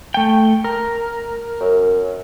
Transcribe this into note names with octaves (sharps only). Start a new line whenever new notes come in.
A3 G5
A#4
F#2